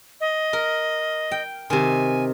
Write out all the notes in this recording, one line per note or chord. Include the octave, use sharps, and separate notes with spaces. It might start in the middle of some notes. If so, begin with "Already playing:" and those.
D#5
A#4
G5
C3 D#3 G#5